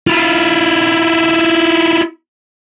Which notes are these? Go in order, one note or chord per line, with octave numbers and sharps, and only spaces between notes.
E4 F4